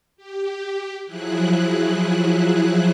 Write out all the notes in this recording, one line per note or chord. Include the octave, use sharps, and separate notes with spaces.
G4
F3 F#3 E4 G#4 F#6